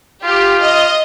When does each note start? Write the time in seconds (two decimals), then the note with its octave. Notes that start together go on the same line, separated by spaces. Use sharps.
0.23 F4 G4
0.61 D#5